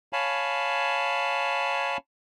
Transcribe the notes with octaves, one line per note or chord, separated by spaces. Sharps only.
C#5 F5 G#5 A5 B5